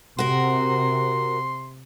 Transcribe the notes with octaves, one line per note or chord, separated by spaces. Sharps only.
C3 F#4 A#4 C6